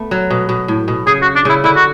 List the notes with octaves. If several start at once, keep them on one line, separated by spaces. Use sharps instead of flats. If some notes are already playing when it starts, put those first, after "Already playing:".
Already playing: A3 B3
F#3
B2
B2
A2
B2
C#3 G#4
F#4
D4
C#3 E4
D3 E4
F#4